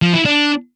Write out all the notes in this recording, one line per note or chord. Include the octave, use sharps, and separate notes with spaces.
F3
E4
D4